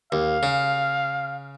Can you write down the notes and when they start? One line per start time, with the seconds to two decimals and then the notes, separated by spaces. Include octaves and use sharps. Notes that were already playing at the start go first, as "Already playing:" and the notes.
0.12 D#2 F5
0.43 C#3